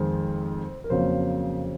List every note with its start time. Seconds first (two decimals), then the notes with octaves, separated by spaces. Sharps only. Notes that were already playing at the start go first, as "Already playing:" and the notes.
Already playing: F2 D#3 G#3 C4 C5
0.84 A#4
0.90 F2 C#3 F#3 A#3 C4 C5